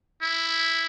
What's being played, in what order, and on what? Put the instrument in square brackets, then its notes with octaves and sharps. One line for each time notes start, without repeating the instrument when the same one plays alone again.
[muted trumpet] E4